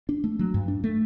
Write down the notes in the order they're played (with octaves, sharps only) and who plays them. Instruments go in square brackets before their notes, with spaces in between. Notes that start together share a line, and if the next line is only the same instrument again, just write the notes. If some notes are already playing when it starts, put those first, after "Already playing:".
[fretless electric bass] D4
A3
F#3
G2
D4
A3